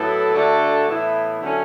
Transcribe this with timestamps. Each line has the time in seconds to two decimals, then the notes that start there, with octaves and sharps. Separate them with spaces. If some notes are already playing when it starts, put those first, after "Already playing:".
Already playing: A2 F#3 B3 E4 A4
0.34 D3 A3 D4 F#4 A4
0.87 A2 E3 B3 E4
1.40 D3 F#3 A3 C#4